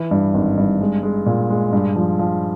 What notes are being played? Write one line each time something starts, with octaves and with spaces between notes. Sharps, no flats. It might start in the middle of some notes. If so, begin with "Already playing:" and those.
Already playing: E3
G2
G#1
G2
G#3
G#3
A#2
G#3
G2
F3
F3